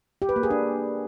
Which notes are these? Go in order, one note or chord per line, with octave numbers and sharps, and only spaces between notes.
G4
B4
A#3
G#4
D4